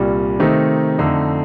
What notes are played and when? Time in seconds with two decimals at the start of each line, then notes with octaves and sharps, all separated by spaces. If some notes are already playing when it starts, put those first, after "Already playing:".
Already playing: C2 A#2 G3
0.39 C3 D#3 A3 C4 D#4
0.98 F2 D3 A3 D#4